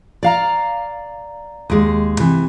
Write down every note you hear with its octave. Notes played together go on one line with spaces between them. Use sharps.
D5 F5 A#5
D#2 G#3
C3 E3